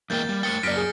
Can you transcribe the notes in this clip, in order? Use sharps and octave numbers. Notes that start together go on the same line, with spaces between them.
E2 G#3 A#3 G5 G6 A6
G3
A3 A#4 G5 A6 C#7
F#2 A#3 D5 F6 A#6 B6 D7
G#4